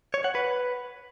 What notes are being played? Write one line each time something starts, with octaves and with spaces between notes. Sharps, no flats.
C#5
F#5
B4